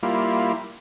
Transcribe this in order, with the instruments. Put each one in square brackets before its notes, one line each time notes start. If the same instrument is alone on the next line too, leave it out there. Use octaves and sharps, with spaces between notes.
[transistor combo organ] G3 A#3 E4 F4